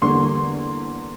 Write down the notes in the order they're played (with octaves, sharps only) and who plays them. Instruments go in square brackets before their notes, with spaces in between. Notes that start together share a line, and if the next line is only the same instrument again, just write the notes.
[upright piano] E2 D3 G3 A#3 C6